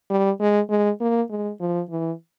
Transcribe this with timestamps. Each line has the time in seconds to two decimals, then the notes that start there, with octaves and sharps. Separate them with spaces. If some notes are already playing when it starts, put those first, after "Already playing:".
0.10 G3
0.40 G#3
0.69 G#3
1.01 A#3
1.30 G#3
1.60 F3
1.90 E3